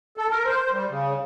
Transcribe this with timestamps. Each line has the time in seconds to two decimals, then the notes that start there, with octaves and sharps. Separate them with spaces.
0.17 A4
0.31 A#4
0.45 C5
0.72 G3
0.90 C#3